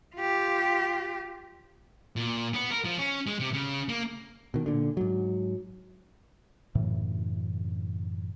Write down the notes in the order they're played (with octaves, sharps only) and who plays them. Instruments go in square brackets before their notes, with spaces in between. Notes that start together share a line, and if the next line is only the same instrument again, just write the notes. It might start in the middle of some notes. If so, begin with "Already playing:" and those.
[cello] F4 G4
[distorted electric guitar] A#2
B3
A#4
F3
C#4
G#3
C3
C#3
A#3
[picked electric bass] B2 D#3
A#2 D3
G#2 F#3
[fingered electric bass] F#2 A2 C#3 E3